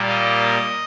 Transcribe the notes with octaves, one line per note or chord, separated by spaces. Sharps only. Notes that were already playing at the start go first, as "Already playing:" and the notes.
Already playing: A#2 G3 A#3
D#5